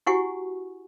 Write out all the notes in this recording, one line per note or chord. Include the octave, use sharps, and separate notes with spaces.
E4 F#4 G4 F#5 G#5 C#6